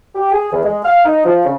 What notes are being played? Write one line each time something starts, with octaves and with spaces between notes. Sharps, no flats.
G4
G#4
E2
G#3
F5
D#4
F3
C#3